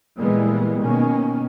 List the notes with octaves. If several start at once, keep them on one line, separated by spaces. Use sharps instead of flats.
A#2 E3 G3 G#3 A#3 B3
B2 D#3 A#3 C#4